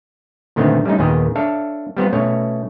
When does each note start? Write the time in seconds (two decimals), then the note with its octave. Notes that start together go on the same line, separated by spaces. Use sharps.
0.56 A#2 D3 D#3 A3 B3 C4
0.85 G3 A3 C#4 D#4
0.99 D#2 A#2 D#3 B3 G#4 G5
1.36 D4 A4 C#5 E5 F5
1.97 G3 B3 C4 F4
2.13 B2 A3 C#4 C#5